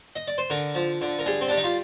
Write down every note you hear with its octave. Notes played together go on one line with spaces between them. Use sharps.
D#5
D5
C5
D3 A#4
F3
D3
A#4
G3 G#4
C4
D4
G3
D#4
F4